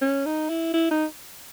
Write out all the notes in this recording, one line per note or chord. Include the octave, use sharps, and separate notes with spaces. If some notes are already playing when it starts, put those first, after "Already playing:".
C#4
D#4
E4
E4
D#4